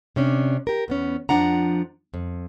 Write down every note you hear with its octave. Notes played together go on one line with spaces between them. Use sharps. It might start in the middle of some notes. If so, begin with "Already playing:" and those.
C3 C#4 D4
G4 A#4
E2 B3 C#4
F2 F3 D4 F#5 A#5
F2